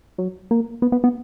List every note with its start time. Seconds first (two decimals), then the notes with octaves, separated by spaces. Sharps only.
0.18 F#3
0.51 A#3
0.82 B3
0.92 B3
1.04 B3